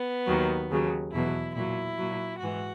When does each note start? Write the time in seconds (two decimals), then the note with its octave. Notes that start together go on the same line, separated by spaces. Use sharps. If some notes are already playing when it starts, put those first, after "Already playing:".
Already playing: B3
0.27 D#2 D#3 F#3
0.70 D#2 C#3 F#3
1.13 E2 B2 F#3 E4
1.55 A#2 F#3 E4
1.98 A#2 F#3
2.40 G#2 E3 F#4